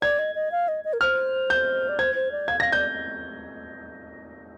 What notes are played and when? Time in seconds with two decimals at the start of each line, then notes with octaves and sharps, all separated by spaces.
0.02 D5 G#6
0.19 D#5
0.35 D#5
0.52 F5
0.68 D#5
0.85 D#5
0.93 A#4
1.01 C5 F6
1.50 G6
1.89 D5
1.99 C5 G#6
2.15 C5
2.32 D5
2.48 F5 G#6
2.60 F5 A#6
2.72 D5 G6